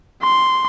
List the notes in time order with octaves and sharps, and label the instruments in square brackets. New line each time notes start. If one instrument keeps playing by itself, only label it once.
[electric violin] C6